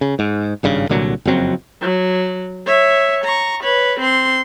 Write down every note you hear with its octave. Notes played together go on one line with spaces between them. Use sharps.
C#3
G#2
G#1 G2 C#3
C2 A#2 D3 F#3
F#1 F2 F#3 C4
F#3
C#5 E5
A#5 C#6
B4 C#5
C4 C6